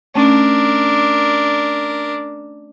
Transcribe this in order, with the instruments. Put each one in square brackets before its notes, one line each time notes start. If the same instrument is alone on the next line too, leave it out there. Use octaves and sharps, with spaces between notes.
[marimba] A3 C#4 [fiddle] D4 A#4